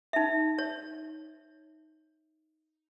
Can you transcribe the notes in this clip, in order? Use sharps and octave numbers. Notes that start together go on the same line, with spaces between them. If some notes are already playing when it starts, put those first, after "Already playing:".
D#4 E5
C#5